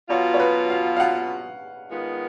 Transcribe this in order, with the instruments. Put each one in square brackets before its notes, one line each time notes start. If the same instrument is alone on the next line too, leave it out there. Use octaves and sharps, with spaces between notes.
[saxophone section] B2 F#3 B3 F4 [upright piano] C#5
[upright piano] C#5
B4
F5
F5
F#5
[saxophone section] D#3 G#3 B3 F4